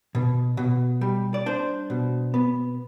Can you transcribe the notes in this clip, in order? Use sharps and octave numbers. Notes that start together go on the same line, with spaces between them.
B2
B2
G3
D5
D4 C5
B2
B3